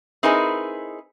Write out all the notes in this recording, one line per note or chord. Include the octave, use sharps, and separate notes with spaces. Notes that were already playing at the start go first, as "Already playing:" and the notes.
C4 D#4 E4 G#4 A#4 B4